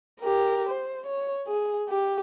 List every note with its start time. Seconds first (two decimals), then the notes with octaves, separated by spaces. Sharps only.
0.20 G4 A#4
0.69 C5
1.06 C#5
1.47 G#4
1.89 G4